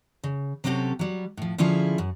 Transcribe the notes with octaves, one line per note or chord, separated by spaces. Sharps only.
C#3
C3 F#3 C4 C#4 G4 A4
F#3 G3
A2 F3
D3 F3 C#4 E4 F4 G#4
F#2